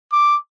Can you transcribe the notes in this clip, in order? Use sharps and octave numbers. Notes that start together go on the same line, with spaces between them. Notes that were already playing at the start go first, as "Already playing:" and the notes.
D6